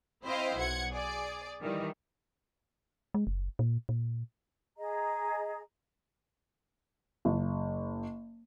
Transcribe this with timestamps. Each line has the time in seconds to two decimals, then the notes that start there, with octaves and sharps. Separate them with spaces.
0.25 C4 E4 C5 D#5 F5 G5
0.57 B1 F#5 G#6 C#7
0.91 G#4 D5
1.61 D#3 E3 G3
3.14 G#3
3.27 F#1
3.59 A#2
3.89 A#2
4.77 G#4 D#5 A#5
7.25 F#1